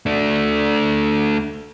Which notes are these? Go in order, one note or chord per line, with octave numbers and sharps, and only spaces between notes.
A3 D4